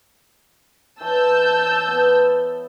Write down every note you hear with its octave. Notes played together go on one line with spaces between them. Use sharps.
E3 B4 C#5 A5 E6 G6
B3